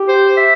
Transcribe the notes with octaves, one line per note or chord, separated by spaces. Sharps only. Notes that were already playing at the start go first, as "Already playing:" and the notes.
Already playing: G4
C5
E5